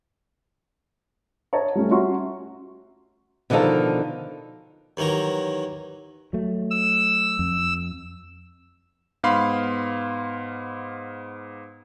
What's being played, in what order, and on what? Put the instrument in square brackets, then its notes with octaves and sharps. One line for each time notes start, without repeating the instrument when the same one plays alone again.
[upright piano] C#5 D#5 E5 A5 A#5
G3 A3 C#4
C#4 F#4 E5 A#5 C6 C#6
[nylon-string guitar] B2 D3 D#3 F3 D#4 A4
[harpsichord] D#2 D#3 E3 F#3 A#5
[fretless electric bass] F#3 A3
[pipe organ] E6
[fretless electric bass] F2
[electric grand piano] G#2 B3 F5 B5 C6